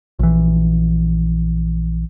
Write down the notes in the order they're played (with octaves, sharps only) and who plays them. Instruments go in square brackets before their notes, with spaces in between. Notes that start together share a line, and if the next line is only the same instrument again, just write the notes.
[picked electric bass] A#1 E3